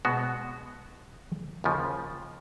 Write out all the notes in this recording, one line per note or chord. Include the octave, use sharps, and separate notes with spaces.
B2 G#3 B3 F#4
D#2 C#3 F3